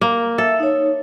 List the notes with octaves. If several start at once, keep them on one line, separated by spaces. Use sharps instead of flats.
A#3
A4 E5
D#4 C#5